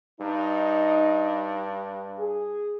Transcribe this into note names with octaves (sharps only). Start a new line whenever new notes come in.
G2 D#4
G#4